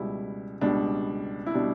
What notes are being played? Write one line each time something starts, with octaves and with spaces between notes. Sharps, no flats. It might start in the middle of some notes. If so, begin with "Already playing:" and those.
Already playing: C#2 B2 G3 E4
C#2 B2 G3 D4
E4
B2 G3 D4